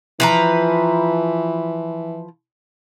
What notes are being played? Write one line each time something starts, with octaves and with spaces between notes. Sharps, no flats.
E3 F3 B4 A#5